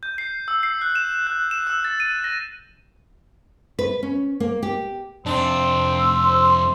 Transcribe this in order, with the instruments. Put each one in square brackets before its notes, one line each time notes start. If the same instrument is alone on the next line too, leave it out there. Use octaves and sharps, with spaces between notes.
[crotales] G6
C7
E6
C7
F#6
E7
F#6
E7
E6
A6
D#7
A#6
[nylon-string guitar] B4
C#4
A#3
G4
[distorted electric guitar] F2 C3 [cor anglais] C4 [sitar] D4
[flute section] C6 E6
[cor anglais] C5